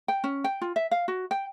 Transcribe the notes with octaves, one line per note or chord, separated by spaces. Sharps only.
G5
C#4
G5
F4
E5
F5
F#4
G5